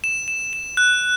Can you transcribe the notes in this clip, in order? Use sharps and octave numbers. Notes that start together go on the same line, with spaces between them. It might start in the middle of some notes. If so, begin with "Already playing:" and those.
E7
E7
E7
F#6